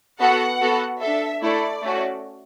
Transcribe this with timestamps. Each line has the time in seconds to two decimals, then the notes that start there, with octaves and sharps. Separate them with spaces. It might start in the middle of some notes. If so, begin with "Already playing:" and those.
0.20 B3 F#4 A4 F#5
0.61 B3 F#4 A4
1.02 D4 A4 E5
1.42 A3 E4 A4 D5
1.82 A3 C#4 F#4